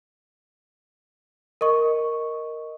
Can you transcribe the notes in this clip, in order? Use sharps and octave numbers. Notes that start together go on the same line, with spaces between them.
A#4 D#5 C#6